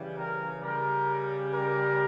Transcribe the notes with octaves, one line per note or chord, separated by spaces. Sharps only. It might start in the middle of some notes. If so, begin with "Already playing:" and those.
Already playing: C#3 E3 G3
A#4
C#3 G3 A#4
A#4